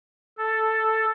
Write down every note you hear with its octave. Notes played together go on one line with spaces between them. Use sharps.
A4